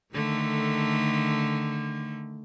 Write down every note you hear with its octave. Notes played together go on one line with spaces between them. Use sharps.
D3 D#3 A3